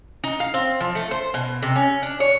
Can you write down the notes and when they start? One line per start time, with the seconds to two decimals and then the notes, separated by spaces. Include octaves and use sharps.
0.24 D#4
0.40 F5
0.54 C4
0.80 F3
0.95 A3
1.11 C5
1.34 B2
1.63 C3
1.76 C#4
2.02 D4
2.20 C#5